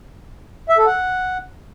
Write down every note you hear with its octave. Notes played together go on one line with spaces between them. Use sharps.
E5
A4
F#5